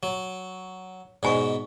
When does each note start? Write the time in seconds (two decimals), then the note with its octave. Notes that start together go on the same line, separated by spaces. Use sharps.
0.03 F#3
1.23 G#2 B2 D5 G#5 C#6